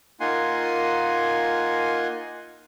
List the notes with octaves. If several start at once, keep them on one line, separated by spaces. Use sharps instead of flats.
A#3 D#4 F4 F#5 G#5 C6